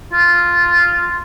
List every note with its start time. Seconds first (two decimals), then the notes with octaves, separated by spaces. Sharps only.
0.13 F4